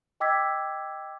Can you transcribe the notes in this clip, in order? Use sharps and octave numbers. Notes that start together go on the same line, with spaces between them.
D#5 G5 D6 E6 G#6 B6